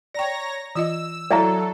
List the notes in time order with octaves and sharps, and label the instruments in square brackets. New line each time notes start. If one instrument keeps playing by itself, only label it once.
[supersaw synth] C#5 A#5 A#6 [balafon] D5 G5
[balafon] E3 F4 D#5 [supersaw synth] E6
[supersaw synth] F#3 A4 [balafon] E4 C#5 F5 [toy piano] D5 E5 A#5